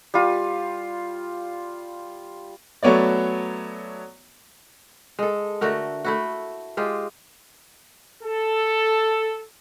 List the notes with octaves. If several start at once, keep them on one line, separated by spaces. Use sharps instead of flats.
G3 F4
F#3 A3 B3 C#5 D5
G#3 A4
D3 A3 F#4 A#4
A3 E4 F#4
G#3 F4 G4
A4